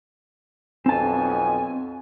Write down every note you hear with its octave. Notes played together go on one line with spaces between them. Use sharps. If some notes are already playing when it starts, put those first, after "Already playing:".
B1 F2 C4 G#5 A5